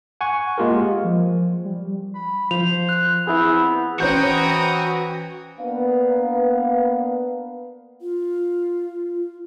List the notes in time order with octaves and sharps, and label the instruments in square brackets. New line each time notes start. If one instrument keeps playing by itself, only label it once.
[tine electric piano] F#5 G#5 C#6
G#3 A#3 F4 G4 A#4
[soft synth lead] F3
G3
[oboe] B5
[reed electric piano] F3 [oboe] C5 [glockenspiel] F7
[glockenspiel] F#6
[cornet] B3 [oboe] C4 [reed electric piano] E4 G#4
[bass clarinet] E3 [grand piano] C#4 C5 G6 [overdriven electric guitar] F#4 [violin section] G5 A#5 D#6
[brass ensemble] A#3 B3 D4 B4 F5
[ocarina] F4